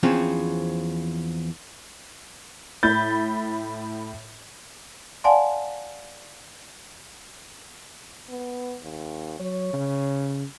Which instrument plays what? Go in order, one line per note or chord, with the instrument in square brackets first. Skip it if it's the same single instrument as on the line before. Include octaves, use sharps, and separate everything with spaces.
[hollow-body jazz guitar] E2 F3 C4 C#4
[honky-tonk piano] A2 B5 G6 A6
[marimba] D5 F5 F#5 G#5 A5 C6
[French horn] B3
D#2
[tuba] F#3 [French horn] C#5
[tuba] C#3